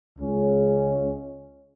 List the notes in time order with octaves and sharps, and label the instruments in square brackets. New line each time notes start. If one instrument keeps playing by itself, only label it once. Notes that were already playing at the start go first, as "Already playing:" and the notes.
[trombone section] C#2 C#3 G#3 C#4